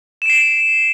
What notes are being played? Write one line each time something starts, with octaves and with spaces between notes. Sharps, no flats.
C7 D7 E7